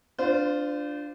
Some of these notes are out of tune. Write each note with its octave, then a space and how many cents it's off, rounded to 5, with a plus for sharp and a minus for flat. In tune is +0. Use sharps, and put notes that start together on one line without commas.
D4 +0 F4 +0 C5 -35